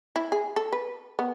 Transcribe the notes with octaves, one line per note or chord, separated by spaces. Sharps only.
E4
G#4
A4
B4
B3